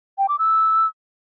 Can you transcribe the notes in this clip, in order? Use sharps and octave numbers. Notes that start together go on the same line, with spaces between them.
G5
D6
E6